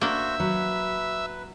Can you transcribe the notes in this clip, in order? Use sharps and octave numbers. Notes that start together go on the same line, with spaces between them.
A#3 D4 F#4 C5 E5
F#3 B4